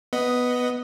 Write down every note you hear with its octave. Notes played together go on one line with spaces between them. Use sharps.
B3 D#5